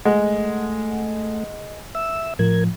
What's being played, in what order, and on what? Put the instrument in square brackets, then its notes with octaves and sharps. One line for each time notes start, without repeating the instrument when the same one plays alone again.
[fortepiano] G#3 [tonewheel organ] A3 [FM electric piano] F#5
[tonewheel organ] E5 E6
[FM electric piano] A2 F3 [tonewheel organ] A#4 G#6